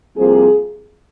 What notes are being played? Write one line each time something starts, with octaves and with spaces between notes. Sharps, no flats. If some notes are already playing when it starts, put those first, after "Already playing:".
C2 C3 F3 A#3 G#4